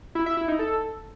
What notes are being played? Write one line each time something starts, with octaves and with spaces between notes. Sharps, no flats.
E4
E5
E4
D#4
A4